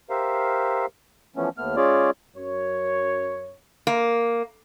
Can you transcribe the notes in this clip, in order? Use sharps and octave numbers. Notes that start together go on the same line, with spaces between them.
G4 A#4 C5 E5 F5
E3 F3 A3 B3 C#4
D#2 A3 B3 F6
G#3 C#4 F4 G#4 C#5 D5
F#2 C#5
A#3